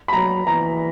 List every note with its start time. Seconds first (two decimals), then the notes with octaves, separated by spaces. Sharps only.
0.08 B5
0.13 F#3 A#5
0.47 E3 A#5